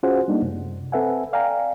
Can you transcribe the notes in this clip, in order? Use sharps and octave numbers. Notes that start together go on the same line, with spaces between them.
C#4 F4 F#4 G#4 C5 F#5
G3 A3 A#3 D4 D#4
F#2 C3
C4 A4 B4 E5 F#5 G#5
D5 F5 G5 G#5 A#5